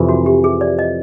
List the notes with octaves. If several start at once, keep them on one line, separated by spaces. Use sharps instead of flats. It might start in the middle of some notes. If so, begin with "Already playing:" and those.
Already playing: F2 C3 E3
F#4
G4
G#4
D5
D#5